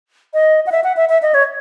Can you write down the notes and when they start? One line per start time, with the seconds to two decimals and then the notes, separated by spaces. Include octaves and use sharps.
0.34 D#5
0.67 F#5
0.72 E5
0.84 F#5
0.97 E5
1.09 E5
1.22 D#5
1.34 C#5